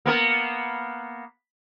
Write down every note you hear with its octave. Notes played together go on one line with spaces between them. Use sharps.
A#3 B3 A#4